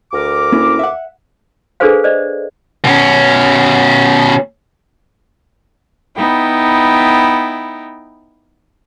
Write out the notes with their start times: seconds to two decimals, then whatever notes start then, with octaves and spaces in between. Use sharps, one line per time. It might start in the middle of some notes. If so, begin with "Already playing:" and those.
0.12 D2 A#4 D6
0.52 A#3 C#4 E4
0.79 E5 F#5
1.80 D4 G#4 A4 B4 C5 F5
2.04 C5 D5 D#5
2.85 B2 C#4
6.16 B3 D#4 E4 G5